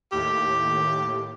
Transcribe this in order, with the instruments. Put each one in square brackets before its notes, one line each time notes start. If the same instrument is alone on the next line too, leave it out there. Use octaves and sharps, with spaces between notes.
[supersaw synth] D#2 A2 [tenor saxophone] G4